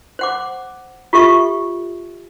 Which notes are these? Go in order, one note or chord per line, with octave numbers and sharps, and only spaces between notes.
C5 F#5 D6
F4 G4 A4 E5 C#6